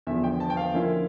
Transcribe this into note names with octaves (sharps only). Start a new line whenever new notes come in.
E2 D3 F3 E5
G5
A5
G5
F5
D3 F3 A#3 C#4 E4